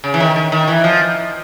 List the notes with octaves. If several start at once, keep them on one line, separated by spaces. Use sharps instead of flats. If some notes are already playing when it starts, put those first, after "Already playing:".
C#3
E3
D#3
D#3
D#3
E3
F3